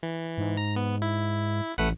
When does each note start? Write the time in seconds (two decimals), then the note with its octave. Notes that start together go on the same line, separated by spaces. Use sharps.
0.03 E3
0.38 G#2
0.57 A#5
0.76 B3
1.02 E4
1.78 A1 A3 B4 F#5